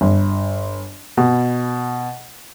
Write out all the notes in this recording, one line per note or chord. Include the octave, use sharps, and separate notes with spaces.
G1
B2